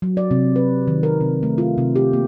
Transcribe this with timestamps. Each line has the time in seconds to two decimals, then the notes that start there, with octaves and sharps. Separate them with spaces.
0.02 F#3
0.17 D5
0.31 C3
0.56 B4
0.88 D#3
1.03 A#4
1.21 C3
1.43 A3
1.58 F4
1.78 C3
1.96 G4
2.13 A#3